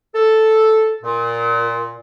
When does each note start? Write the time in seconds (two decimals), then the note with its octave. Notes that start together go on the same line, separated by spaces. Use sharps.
0.14 A4
1.03 A#2